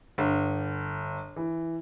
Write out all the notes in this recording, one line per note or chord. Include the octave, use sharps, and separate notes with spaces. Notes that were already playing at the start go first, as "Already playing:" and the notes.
G1
E3